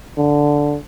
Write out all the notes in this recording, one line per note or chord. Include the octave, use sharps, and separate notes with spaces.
D3